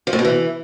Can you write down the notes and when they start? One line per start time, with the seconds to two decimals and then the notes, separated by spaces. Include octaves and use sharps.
0.07 F3
0.13 A2
0.19 B2
0.25 E3